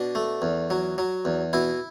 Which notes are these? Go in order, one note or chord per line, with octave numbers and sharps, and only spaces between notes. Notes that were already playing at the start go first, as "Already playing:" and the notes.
Already playing: B2 D4
A3
E2
F#3
F#3
E2
B2 E4